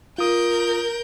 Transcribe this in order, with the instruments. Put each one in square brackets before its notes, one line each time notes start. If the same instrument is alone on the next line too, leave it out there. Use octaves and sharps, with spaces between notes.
[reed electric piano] F4 D#6 [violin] A#4 G6